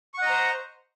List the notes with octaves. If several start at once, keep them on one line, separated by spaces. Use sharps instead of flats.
C5 D#5 F#5 A#5 C#6